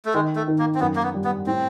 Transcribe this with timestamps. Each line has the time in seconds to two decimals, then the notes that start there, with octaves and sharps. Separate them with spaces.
0.05 A3
0.14 D#3 G#3
0.36 A3
0.48 D#3
0.59 A#3
0.75 C4
0.80 F#2 B3
0.96 A#3
1.03 B3
1.14 G3
1.24 B3
1.46 A2 C4